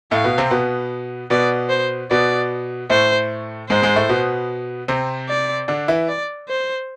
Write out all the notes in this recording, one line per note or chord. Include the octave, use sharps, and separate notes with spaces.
A2 A3 F5
B2 B3
C3 C4
B2 B3
B2 B3 D5
C5
B2 B3 D5
A2 A3 C5
G#2 G#3 C5
G#2 G#3
A2 A3
B2 B3
C3 C4
D5
D3 D4
E3 E4
D5
C5